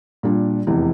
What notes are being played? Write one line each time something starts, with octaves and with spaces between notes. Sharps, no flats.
A#2 G3 D4
F1 E2 E3